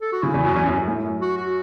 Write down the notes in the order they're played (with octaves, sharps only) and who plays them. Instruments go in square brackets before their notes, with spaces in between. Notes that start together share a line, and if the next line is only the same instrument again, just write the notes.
[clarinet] A4
F#4
[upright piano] C#3 [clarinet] E4
[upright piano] E2 [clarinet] E4
[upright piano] F#2 [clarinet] F#4
[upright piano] E2 [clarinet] C#4
[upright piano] F#2 [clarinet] C#4
[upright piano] F#2
A2
F#2
[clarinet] F#4
F#4